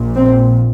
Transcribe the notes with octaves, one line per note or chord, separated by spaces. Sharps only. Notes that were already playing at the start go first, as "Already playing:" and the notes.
Already playing: A#1 A#2
C4